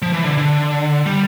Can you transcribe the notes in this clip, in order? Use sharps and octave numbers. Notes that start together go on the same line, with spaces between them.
F3
E3
D3
D3
G3